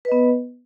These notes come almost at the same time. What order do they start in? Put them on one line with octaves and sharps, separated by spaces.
B4 D#5 B3